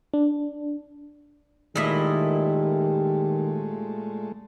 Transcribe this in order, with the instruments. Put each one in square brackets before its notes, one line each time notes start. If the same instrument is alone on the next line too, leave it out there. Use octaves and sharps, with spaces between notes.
[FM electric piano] D4
[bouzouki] A#2 E4 D#5 [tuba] D#3 [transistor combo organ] G#3 A3 [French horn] G4